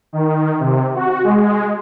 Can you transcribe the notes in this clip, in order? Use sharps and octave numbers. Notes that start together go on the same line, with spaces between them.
D#3
C3
F#4
G#3